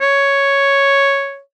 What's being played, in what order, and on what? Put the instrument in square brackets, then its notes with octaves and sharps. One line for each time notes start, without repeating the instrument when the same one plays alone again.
[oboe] C#5